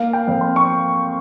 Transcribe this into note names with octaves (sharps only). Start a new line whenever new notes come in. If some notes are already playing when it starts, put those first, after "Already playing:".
Already playing: A#3 F5
G5
F2
C6
C#6